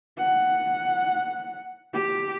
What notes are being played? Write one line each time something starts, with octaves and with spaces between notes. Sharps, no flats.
F#5
G4